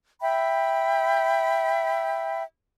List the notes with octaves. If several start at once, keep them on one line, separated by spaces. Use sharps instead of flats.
E5 G5 B5